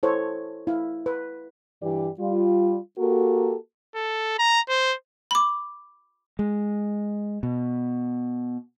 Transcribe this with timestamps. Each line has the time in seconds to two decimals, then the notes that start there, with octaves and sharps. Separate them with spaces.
0.03 E4 A4 C5 C#5
0.67 E4 F5
1.06 B4
1.82 G2 E3 G4 D5
2.19 G3 F4
2.98 A#3 F#4 G4 A4 A#4
3.95 A4
4.39 A#5
4.69 C5
5.31 B5 D6
6.39 G#3
7.43 B2